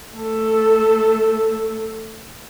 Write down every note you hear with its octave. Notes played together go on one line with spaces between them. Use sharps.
A3 A4